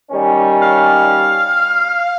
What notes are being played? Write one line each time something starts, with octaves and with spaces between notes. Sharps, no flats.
D#3 G3 C#4
F5